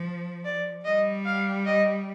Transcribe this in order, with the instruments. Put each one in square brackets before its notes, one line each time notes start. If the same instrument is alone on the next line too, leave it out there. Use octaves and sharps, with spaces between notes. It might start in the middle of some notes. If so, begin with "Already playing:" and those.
Already playing: [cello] F3
[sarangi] D5
[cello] G3 [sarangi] D#5
[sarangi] F5
D#5